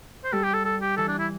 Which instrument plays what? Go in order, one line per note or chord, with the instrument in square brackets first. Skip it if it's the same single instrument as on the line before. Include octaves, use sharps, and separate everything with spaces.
[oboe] C5
[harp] G3 [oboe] A4
[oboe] G4
A4
A4
G4
[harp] E3 [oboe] A4
[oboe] D4
E4